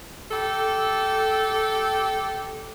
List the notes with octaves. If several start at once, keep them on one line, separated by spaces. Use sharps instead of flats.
G4 A4